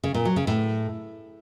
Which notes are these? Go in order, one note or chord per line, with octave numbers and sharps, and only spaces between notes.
C#3
A#2
F#3
C#3
A2